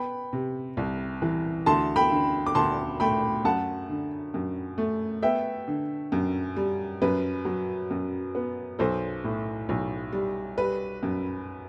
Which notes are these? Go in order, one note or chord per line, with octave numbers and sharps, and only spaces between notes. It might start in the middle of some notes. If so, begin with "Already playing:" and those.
Already playing: B3 G5 B5
C3
C2
E3
D2 A5 C6
G5 B5
D3
D6
D2 A5 C6
A3 G5 B5
F#2 F#5 A5
D3
F#2
A3
B3 E5 G5
D3
F#2
G3
F#2 B4
F#3
F#2
B3
B1 A4 C5
A2
B1
G3
G3 B4
F#2